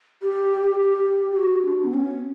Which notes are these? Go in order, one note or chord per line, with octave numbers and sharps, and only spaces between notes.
G4
G4
G4
F#4
D4
B3
C#4